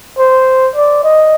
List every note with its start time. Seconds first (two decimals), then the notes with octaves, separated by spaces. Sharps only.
0.18 C5
0.76 D5
1.04 D#5